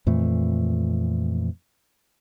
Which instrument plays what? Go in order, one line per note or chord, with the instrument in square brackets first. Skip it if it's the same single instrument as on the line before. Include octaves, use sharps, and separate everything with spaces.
[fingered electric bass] F2 A#2 E3 A3